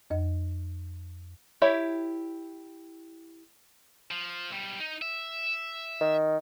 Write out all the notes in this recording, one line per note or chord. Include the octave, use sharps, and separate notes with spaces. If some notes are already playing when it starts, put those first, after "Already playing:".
F2 D#5
E4 G4 C#5 E5
F3
B1 G3
D#4
E5
D#3